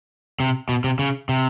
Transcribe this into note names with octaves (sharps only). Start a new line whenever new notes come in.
C3
B2
C3
C#3
C3